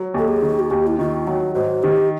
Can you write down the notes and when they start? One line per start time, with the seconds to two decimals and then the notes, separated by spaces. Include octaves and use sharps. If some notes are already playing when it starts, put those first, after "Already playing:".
Already playing: F#3
0.14 D#2 A4
0.28 G#4
0.42 D#3
0.59 F#4
0.70 D#2 G4
0.87 E4
0.99 D#3 F4
1.27 F#3 F#4
1.55 G#2 F#4
1.83 D#3 G4